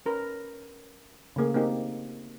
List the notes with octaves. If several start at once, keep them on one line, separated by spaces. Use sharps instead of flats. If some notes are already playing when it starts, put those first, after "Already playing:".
C#4 A#4 B4
C#3 A3 A#3 G#4
A#3 C4 D#4 G4